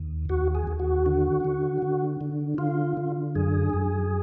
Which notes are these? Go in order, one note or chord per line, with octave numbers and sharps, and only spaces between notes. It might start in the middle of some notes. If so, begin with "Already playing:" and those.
Already playing: D#2
D#2 F#4
G#4
D#2
F#4
D3
D3
D3
D3
D3 F4
D3
F#2 G#4
F#2